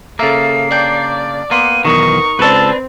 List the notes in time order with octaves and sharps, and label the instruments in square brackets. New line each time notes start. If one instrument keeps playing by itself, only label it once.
[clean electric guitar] C#3 A#3 [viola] A4 [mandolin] E5 A5 [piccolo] C7
[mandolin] D4 G5 [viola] D5
[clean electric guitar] A#3 [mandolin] B3 C6 [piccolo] D#7
[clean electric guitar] B1 E2 D#3 [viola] D#4 A#4 [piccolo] C#6
[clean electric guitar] C#2 A4 [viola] C4 [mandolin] D4 B4